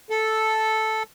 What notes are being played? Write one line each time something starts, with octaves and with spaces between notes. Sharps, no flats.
A4